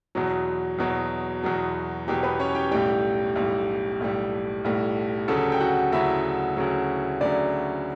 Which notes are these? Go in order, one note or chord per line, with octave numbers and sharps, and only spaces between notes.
E2 B2 F#3
E2 B2 F#3
E2 B2 F#3
E2 B2 F#3 G4
B3 B4
C#4 C#5
G4 G5
B1 A2 G3 G4 G5
B1 A2 G3
B1 A2 G3
B1 A2 G3
D2 C#3 F#3 A4 A5
G5
F#4 F#5
D2 C#3 F#3 E4 E5
D2 C#3 F#3
D2 C#3 F#3 D4 D5